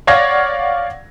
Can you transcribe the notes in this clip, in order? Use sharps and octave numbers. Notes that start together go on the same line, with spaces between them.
C#5 D5 F5 F#5 G#6 A#6